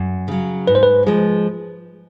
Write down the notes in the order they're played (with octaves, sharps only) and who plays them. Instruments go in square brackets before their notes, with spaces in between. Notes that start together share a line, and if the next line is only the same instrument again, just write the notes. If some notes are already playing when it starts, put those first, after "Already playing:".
Already playing: [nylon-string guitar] F#2
C#3 F#3
[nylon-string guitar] G#2 [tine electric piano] B4
[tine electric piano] C5
B4
[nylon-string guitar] F3 G#3